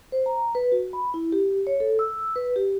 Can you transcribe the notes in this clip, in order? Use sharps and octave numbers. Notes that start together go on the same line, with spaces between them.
C5
A#5
B4
F#4
B5
E4
G4
C#5
A4
E6
B4
G4